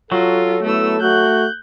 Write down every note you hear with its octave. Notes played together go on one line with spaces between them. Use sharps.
F#3 F4 A4
A3 B3 E4 A4 E6
A3 F#4 F#6 G6